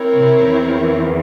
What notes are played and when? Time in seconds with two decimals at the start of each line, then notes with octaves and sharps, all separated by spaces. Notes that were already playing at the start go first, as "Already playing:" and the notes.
Already playing: C4 E4 A#4 C#5
0.14 C3
0.43 E2 E3